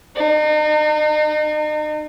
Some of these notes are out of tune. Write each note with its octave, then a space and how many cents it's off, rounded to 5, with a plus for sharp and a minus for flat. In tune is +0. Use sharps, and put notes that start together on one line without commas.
D#4 -40